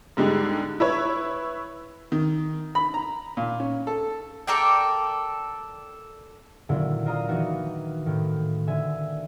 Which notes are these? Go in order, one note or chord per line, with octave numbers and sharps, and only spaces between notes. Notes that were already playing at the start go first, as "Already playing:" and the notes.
G#2 D3 G3 G#3
E4 B4 C#5
D#3
B5
A#5
A#2
C#4
A4
A4 A#4 D5 G5
A#2 D3 D#3 F#3 E4
F4 A#4 D#5 A#5 C6 D#6
D#3 E3 B3 D#4 F#4
A2 D#3
D3 E5 G#5